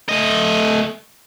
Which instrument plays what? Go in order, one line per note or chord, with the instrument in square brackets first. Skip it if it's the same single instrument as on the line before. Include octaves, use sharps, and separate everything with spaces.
[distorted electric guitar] A3 D#5